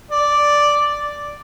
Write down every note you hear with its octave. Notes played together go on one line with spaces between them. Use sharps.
D5